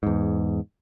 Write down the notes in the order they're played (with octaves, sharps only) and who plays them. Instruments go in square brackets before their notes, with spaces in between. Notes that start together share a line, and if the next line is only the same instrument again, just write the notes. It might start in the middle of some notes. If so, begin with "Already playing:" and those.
[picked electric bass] E2 G#2